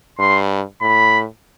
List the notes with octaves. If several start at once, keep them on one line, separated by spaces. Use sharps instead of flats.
G2 C6
A2 B5